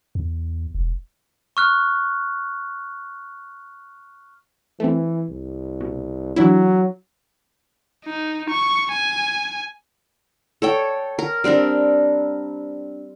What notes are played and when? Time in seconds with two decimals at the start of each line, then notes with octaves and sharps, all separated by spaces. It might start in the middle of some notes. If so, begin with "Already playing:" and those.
0.15 E2
0.75 E1
1.57 C#6 F6 F#6
4.80 E3 A3 C4
5.30 C2
5.80 B2
6.36 E3 F#3 D4 E4
8.05 D#4
8.50 C#6
8.92 G#5
10.62 A4 C#5 G5
11.19 A#4
11.44 G3 C4 D4 A#4